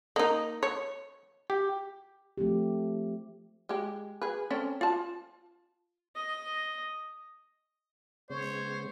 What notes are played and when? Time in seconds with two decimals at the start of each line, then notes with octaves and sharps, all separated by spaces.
0.16 A#3 D#4 D#5
0.63 C#5
1.50 G4
2.38 F3 A3 C4 G4
3.69 G#3 G4
4.22 G#4 B4
4.50 C4 C#4 A4
4.81 F4 A5
6.16 D#5
8.30 C#3 G#3 B3 C5 C#5